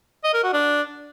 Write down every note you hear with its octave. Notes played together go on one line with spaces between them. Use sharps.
D#5
A#4
F#4
D4